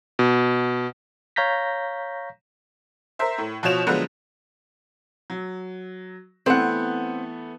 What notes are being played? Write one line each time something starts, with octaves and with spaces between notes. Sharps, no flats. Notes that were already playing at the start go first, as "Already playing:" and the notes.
B2
C#5 F5 A#5 G6 A#6 B6
A#4 C5 E5
A2
B2 F3 F#4 C#5 E7 F7
D3 F3 F#3 G#3 B3
F#3
E3 A3 B3 C4 F#5